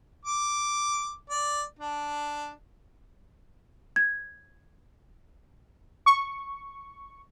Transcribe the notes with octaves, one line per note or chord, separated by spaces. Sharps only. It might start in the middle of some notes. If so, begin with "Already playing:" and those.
D6
D5
D4
G#6
C#6